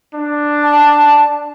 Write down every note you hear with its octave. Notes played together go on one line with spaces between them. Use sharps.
D4
A5